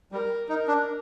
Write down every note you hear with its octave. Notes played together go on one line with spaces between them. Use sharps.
G3 A#4
D#4 A#4
D4